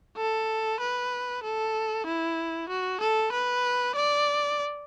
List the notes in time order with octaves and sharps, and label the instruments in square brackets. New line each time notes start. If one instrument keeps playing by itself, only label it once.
[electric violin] A4
B4
A4
E4
F#4
A4
B4
D5